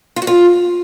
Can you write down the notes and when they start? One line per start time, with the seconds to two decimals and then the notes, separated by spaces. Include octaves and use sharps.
0.16 F4
0.22 F#4
0.27 F4